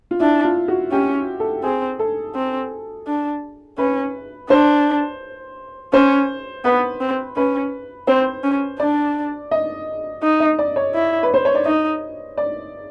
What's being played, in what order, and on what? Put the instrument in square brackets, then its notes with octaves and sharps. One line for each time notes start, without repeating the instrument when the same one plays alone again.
[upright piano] F4
[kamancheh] D4 [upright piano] E4
[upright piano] F4
F#4
[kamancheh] C#4 [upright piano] G4
[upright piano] A4
[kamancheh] C4 [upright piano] G#4
[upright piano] A4
[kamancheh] C4
D4
[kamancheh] C#4 [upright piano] B4
[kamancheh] D4 [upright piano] C5
[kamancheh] C#4 [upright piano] C5
[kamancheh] B3 [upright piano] B4
[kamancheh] C4
[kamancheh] C#4 [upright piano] B4
[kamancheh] C4 [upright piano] C5
[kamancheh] C#4
[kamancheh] D4 [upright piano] D5
[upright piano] D#5
[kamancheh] D#4
[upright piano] D#5
D5
C#5
[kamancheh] E4
[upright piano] B4
C5
C#5
D5
[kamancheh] D#4 [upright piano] D#5
[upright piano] D5